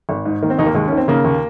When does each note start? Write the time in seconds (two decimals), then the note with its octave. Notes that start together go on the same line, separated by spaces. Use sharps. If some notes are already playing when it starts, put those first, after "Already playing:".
0.09 G#1
0.26 G#2
0.42 D#3 A#3
0.50 C4
0.59 D#2 D#4
0.66 A#3
0.75 D#2 G#3
0.88 C#4
0.92 D#3
0.97 C4
1.08 C#3 A#3
1.24 D#2